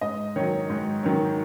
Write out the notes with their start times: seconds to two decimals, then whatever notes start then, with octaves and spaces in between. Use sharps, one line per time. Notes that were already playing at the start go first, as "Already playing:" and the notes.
0.01 G#2 D#5
0.36 D#3 F#3 C#5
0.70 G#2
1.03 D#3 F#3